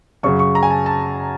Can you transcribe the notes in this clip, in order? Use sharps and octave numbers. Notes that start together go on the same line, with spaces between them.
F#2 C#3 F#3 C#6
C#6
A#5
G#5
A5
A5